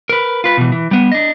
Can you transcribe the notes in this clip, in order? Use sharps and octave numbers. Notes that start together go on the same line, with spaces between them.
A#4 B4
F4 B4
B2 E3
E3
G3 B3
D4 D#5